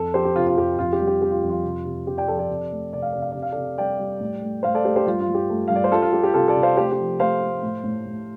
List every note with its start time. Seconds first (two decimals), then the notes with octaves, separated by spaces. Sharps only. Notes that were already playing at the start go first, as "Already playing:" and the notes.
Already playing: F2 A4
0.14 F3 G4 C5
0.25 G4
0.36 C3 F4
0.47 F4
0.57 F2 G4
0.78 F2 F4
0.93 G4
1.00 G3
1.07 G4
1.21 G3 G4
1.31 F4
1.43 F2
1.50 F4
1.64 C3
1.85 C3
2.07 C3 G4
2.17 D5 G5
2.28 F3 A4 D5
2.39 A4 D5
2.50 C3
2.70 A3
2.93 C3 D5
3.02 F5
3.12 C3 D5
3.22 F5
3.31 C3 D5
3.42 F5
3.52 C3 A4 D5
3.78 G3 D5 G5
3.99 G3
4.20 A2
4.42 A3
4.63 A2 C5 F5
4.75 A4 D5
4.85 A3 G4 C5
4.96 G4 C5
5.06 G2 F4
5.20 F4
5.28 G2
5.35 G4
5.50 A3
5.68 G2 F5
5.75 D5
5.84 C5
5.91 G3 F4 A4
6.02 F4
6.13 G3 G4
6.23 G4
6.34 C3 F4 A4
6.48 A4 D5
6.56 C3
6.63 C5 F5
6.77 A3 G4 C5
6.91 G4
6.98 F3
7.19 A3 C5 F5
7.42 A3
7.63 A2
7.84 A2
8.06 A2